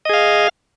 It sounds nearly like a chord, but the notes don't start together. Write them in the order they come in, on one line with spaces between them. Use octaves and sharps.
D#5 G#4 F5